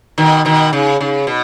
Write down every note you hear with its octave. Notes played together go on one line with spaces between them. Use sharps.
B2 D#3
B2 D#3
C#3
C#3
B2